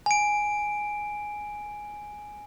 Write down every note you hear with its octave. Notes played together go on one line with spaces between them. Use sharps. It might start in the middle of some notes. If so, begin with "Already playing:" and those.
G#5 D7